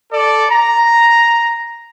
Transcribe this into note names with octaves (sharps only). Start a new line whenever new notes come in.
A4 D5
A#5